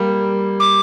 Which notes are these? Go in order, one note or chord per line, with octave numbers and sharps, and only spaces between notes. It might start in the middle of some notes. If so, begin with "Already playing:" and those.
Already playing: G3 A#3
D6